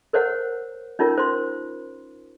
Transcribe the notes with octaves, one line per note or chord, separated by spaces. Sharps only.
A#4 C5 C#5 F#5
C#4 D#4 F4 A#4 C#5
C5 C6